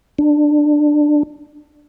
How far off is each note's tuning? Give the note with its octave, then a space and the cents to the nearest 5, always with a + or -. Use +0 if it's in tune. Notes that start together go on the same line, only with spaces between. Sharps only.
D4 +15